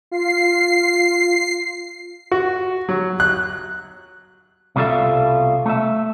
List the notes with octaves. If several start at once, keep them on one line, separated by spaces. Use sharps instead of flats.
F4 C7
F#4
F#3
F#6
C2 B2 G3 F4 A4 E5
A3 E5